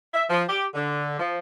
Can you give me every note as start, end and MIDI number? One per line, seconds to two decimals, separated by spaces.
0.14 0.24 76
0.30 0.42 53
0.48 0.64 67
0.74 1.19 50
1.19 1.38 53